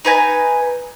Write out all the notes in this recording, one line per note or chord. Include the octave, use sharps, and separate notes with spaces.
D#4 B4 G#5 A#5